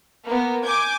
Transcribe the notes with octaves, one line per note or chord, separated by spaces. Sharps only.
A#3 B3
G#5 D6 G6 G#6